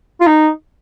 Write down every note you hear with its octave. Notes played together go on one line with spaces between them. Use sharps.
F4
D#4